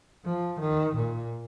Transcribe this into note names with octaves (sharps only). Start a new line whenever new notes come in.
F3
D#3
A#2